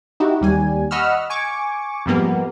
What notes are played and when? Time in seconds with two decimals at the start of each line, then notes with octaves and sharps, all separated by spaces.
0.20 D#4 E4 F#4 G4
0.41 D#2 G3 G#5
0.91 D#5 F#5 B5 C#6 E6 F6
1.30 G#5 C#6 D6
2.06 F2 G#2 G3 A#3 B3